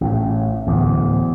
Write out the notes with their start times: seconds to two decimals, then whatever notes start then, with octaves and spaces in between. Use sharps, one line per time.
0.01 A1 A2
0.67 D1 E2